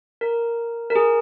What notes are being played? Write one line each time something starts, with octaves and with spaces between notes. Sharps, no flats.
A#4
A#4
G#4